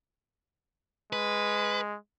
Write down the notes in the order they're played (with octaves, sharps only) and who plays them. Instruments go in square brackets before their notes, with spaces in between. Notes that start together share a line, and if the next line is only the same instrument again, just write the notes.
[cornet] G#3 [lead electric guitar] B4